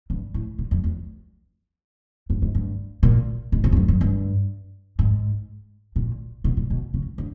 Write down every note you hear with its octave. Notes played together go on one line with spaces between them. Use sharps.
G2
A2
A#2
F2
E2
G2
G#2
G2
A#2
G#2
A2
G2
F#2
F#2
G2
G#2
A#2
B2
A#2
B2
C#3
D3